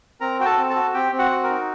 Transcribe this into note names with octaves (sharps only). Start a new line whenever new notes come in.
C4 A#4 A#5
F#4 G5
A4 A5
C4
A4 A5
F#4
C4 G4 G5
C4
F#4 F#5
F#4
A#4
D#4